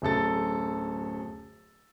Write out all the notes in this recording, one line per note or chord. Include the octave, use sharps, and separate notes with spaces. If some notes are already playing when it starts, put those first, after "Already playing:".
D1 F#2 A4 A6